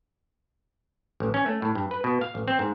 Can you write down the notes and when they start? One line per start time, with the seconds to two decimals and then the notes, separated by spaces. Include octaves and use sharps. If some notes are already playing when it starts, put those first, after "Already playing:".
1.20 A1
1.34 C#4
1.46 A3
1.62 A2
1.75 G2
1.91 B4
2.04 B2
2.21 F5
2.35 A1
2.48 C4
2.59 G#2